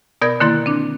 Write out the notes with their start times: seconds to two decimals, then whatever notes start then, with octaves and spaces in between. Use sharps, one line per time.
0.22 B2 B3 A#4 D5 G6 G#6
0.40 D3 D#3 A#3 E4 C6 A6
0.66 C4 D4